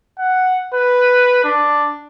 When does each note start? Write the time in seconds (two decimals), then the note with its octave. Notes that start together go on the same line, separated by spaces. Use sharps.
0.19 F#5
0.74 B4
1.44 D4